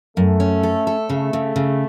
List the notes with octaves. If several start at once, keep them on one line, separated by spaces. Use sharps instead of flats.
F#2 A3
C#4
A4
A4
C#3 A3
C#3
C#3